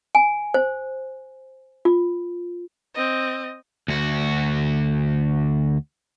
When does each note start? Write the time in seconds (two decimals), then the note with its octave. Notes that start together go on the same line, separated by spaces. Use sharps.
0.15 G#5
0.54 C5
1.85 F4
2.95 C4 D#5
3.88 D2 F#4